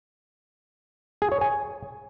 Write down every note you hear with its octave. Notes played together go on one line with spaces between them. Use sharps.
G#4
C#5
G#5